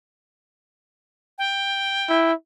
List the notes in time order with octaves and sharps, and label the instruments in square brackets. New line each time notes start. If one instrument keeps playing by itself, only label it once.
[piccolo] G5
[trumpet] E4